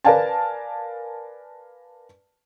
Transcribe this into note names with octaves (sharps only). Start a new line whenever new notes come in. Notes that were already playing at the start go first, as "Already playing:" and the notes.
A#4 B4 D5 F5 G#5 A5